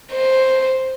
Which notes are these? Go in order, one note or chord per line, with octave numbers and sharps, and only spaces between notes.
C5